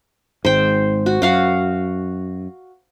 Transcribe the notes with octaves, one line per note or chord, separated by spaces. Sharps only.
G#1 G#2 C5 G5
F#4
F#2 F#4 F5 F#5